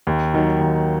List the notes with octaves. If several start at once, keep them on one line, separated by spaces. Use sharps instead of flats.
D#2
D#3 F#3
D#2